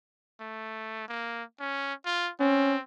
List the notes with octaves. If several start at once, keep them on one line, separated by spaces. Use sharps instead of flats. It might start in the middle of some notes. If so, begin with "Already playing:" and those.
A3
A#3
C#4
F4
C4 C#4